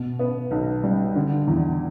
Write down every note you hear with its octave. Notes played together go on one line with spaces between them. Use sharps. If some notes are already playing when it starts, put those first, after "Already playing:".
Already playing: B2
B3
B1
G3
D3
E2